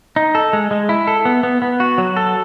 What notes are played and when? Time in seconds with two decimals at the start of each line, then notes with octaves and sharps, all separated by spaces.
0.16 D#4
0.35 A4
0.53 G#3
0.71 G#3
0.89 E4
1.07 A4
1.25 B3
1.43 B3
1.62 B3
1.80 F#4
1.98 F#3
2.17 A4